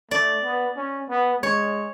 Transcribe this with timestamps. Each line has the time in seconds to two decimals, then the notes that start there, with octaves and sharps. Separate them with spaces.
0.11 A3 D5
0.44 B3
0.77 C#4
1.10 B3
1.42 G#3 C#5